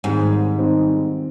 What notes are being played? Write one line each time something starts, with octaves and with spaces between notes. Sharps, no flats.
G#2 D#3 G3 C4 D#4
D#3 G3 C4 D#4